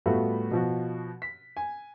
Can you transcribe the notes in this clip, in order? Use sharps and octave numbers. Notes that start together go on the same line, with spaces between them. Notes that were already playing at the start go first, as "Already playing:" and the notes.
A2 G3 A3 B3 F4 F#4
B2 F3 F#4
B6
G#5